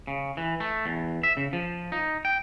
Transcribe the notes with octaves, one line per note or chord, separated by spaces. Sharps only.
C#3
E3
A3
E2
E5
C#3
F3
D#4
G5